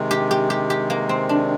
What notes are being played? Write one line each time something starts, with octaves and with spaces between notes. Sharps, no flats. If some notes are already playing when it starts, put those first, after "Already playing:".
Already playing: C3 D#3 G#3
G4
G4
G4
G4
A#3
C4
D4